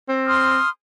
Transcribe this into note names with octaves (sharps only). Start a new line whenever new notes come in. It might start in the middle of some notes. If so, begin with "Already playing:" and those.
C4
C6 D#6 F6